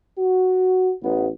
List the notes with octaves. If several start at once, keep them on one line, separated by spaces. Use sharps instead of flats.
F#4
A1 B3